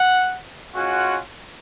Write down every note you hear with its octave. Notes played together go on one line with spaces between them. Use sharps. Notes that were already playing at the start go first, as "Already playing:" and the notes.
Already playing: F#5
G#3 C#4 F4 F#4 F#5